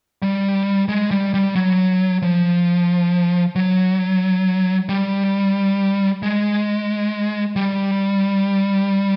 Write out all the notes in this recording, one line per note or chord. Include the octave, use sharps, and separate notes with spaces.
G3
G#3
G3
G3
F#3
F3
F#3
G3
G#3
G3